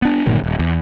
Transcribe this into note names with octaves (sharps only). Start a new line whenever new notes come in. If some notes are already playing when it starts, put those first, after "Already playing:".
B3 D4
G1 A#2 D#3 F#3
D#1
E2